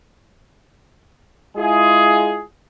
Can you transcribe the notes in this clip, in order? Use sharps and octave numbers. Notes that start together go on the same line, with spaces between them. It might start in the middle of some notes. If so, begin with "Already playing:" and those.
G#3 E4 F4 G#4